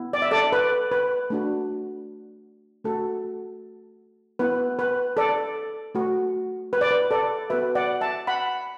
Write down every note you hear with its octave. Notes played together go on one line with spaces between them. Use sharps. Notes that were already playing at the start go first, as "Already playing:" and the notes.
Already playing: B3 E4
D5
E5
A4 D5
B4
B4
A3 D4 F#4
A3 F#4 A4
B3 E4 B4
B4
A4 D5
A3 F#4
B4
D5
B4
A4 D5
B3 F#4 B4 E5
D5 F#5
E5 A5
F#5 B5